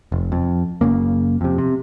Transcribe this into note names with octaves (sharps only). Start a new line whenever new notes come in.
F1
F2
F#1 C#3 A#3
F2 C3
C3